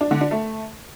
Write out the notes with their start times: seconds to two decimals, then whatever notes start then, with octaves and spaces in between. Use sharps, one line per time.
0.01 D4
0.11 D3
0.21 D4
0.31 A3